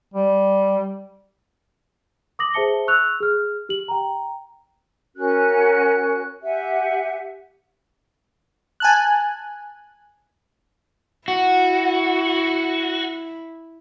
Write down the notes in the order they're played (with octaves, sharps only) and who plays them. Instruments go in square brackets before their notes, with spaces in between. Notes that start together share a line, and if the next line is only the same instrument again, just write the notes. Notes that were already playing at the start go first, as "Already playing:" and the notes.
[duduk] G3
[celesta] D6 D#6 A#6 F#7
G#4 C5 E5 A5 C#7 G7
C#6 E6 F#6 F7
G#4 F6
G4 F#7
G5 A#5
[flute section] C#4 F#4 A#4 F#6
G4 E5 F#5 G#5
[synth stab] G#5 A5 F#6
[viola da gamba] E4 [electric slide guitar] F#4